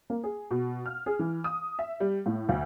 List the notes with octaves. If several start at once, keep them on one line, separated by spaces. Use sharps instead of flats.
A#3
G#4
B2
F6
G#4
E3
D#6
E5
G3
A2
D2